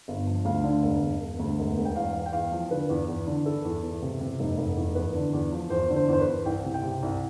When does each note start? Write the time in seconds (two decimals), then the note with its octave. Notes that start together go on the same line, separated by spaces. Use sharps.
0.08 G1
0.27 F3
0.45 D2 F5
0.64 D3
0.83 E1
1.02 E1
1.21 E1
1.39 D2
1.59 E1
1.77 E1
1.85 G5
1.96 E2 F5
2.14 E2
2.26 G5
2.32 E2 F5
2.52 F3
2.71 D3 B4
2.89 E2
3.08 E2
3.27 D3
3.45 E3 A4
3.65 E2
3.83 E2
4.02 C3
4.21 C3
4.40 F1
4.58 F1
4.77 E2
4.95 E2 B4
5.15 D3
5.33 E2
5.52 F3
5.70 E2 C5
5.90 D3
5.96 C5
6.08 E2 C5
6.21 B4
6.27 E2
6.45 C2 G5
6.64 C3
6.74 G5
6.83 C3
7.03 C2